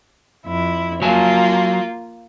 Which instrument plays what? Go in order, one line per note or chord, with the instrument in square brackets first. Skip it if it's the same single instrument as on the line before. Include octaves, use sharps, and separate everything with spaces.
[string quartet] F2 E4
[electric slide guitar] F#3 G#5 A5 [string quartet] A#3 F4